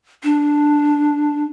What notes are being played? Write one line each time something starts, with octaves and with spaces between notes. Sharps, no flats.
D4